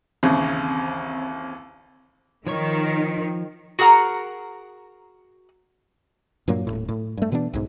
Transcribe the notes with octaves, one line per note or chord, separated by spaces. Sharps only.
A1 D#2 C#3 C4
D#3 F3 C#5 C#6
F#4 G#4 A#4 F#5 A#5
G2 A#2 F#3 A#3
D#1 D#2 A2
A2
G2 A3
B2 E3 B3 D4
B1 G#2